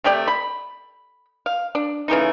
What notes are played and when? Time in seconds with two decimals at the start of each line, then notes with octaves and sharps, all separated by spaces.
0.04 C3 A3 G4 D5
0.28 B5
1.46 F5
1.75 D4
2.08 C#3 E3 A3 D#4